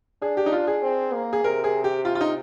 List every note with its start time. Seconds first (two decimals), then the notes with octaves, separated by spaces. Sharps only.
0.22 D4 G#4
0.37 G4
0.46 D#4
0.52 F4
0.67 G#4
0.82 C4
1.13 A#3
1.33 G#4
1.44 C3 A#4
1.64 G#4
1.84 G4
2.05 F4
2.15 F4
2.21 D#4